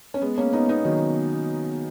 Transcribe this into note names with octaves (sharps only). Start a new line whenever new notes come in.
C#4
G#3 B3
A#3 C#4
B3 D#4
B3 D#4
D#3 F#3